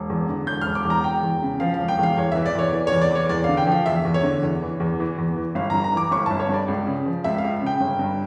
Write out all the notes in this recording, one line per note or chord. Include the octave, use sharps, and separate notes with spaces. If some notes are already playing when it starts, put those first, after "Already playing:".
Already playing: E1
E2
D3
E1 G6
E1 F6
D6
E2
A#5
E1 G5
E2
C#3
F3 F5
E1 F5
G5
E2 F5
E2 C#5
E3 E5
D5
E2 C#5
E3 D5
E2 C#5
D5
E3 C#5
E2 D5
D3 F5
G5
F3 F5
E2 E5
E2
C#5
D3
E2
E3
E2
E3
E2
E3
G1 F5
G2 A#5
A#5
E3 D6
G1 C#6
G1 A5
C#5
G2 D5
C#2
C#3
F3
C#2 E5
F5
C#2
C#3 G5
G1
G2